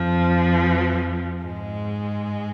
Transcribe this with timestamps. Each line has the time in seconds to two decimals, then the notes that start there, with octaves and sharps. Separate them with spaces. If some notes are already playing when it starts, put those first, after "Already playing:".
Already playing: F2 F3
1.44 G#2 G#3